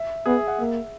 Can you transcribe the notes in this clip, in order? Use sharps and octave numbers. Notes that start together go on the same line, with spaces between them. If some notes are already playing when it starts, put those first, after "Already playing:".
Already playing: E5
B3 G#4
E5
F#5
A#3 E5